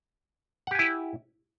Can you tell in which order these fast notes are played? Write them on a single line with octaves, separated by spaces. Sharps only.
F#5 G4 G#5 E4